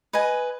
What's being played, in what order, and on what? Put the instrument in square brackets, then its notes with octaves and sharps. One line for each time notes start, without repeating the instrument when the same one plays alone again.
[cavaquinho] B4 D#5 G#5